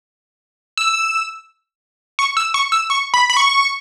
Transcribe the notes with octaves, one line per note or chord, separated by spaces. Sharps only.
E6
C#6
E6
C#6
E6
C#6
B5
B5
C#6